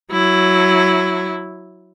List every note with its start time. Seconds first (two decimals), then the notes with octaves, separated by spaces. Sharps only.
0.11 F#3 E4